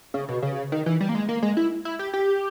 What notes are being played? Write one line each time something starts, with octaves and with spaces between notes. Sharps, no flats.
C#3
B2
C#3
D#3
E3
G3
A#3
G#3
A#3
G#3
E4
E4
G4
G4